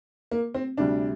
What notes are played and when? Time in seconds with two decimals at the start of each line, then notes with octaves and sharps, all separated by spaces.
0.31 A#3
0.54 C4
0.77 D2 C3 G3 D4